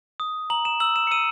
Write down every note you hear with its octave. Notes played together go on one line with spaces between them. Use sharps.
D#6
A#5 F#7
E7
E6 F#7
E7
C#7
E6 D#7